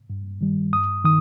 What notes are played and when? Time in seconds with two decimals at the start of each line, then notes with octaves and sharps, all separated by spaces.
0.10 G2
0.41 D#3 G3
0.73 G2 D#6
1.05 D#3 D#6